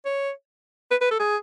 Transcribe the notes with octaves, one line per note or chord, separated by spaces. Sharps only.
C#5
B4
B4
A4
G#4